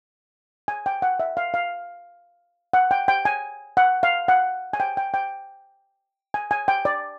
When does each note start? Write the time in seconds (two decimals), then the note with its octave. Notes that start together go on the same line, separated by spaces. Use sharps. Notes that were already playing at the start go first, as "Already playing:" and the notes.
0.68 G#5
0.86 G5
1.02 F#5
1.20 E5
1.37 F5
1.54 F5
2.73 F#5
2.91 G5
3.08 G5
3.25 G#5
3.77 F#5
4.03 F5
4.28 F#5
4.73 G#5
4.80 G5
4.97 G5
5.14 G5
6.34 G#5
6.51 G#5
6.68 G5
6.85 D5